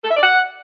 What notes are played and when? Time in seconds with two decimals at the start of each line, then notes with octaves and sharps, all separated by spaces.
0.04 A4
0.11 E5
0.17 D5
0.23 F#5